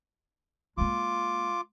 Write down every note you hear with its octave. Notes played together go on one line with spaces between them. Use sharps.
G#3 A#3 F4 D6